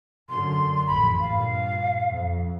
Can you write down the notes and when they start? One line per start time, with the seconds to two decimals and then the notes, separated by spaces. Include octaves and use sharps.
0.29 F#2 D3 C6
0.87 A1 F2 B5
1.20 G2 A#2 F5
2.09 F2